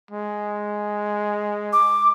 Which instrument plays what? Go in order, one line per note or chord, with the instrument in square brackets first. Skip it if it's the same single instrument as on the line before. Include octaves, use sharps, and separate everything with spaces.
[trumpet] G#3
[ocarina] D6